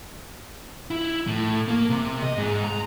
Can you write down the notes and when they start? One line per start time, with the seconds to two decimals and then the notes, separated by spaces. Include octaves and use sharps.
0.91 E4
1.27 A2
1.68 A#3
1.90 C3
2.22 D#5
2.37 G#2
2.64 A#5